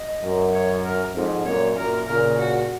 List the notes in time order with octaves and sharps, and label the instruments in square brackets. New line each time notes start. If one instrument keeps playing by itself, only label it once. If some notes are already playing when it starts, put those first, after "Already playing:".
Already playing: [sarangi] D#5
[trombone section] F#2
[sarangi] C#5
A#4
[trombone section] F2 G#2
[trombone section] F#2 A#2 [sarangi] C#5
[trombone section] F#2 A#2 [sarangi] A#4
[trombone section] A#2 C#3 [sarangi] A#4
[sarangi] F#4